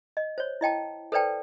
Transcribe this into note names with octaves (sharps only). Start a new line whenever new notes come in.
D#5
C5 C#5
E4 D#5 G5 A5
A4 B4 C5 D5 G5 A5